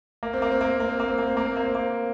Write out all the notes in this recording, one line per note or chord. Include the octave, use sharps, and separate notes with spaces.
A#3
C4
A#3
C4
A#3
C4
A#3
C4
A#3
C4
A#3
C4
A#3
C4
A#3
C4
A#3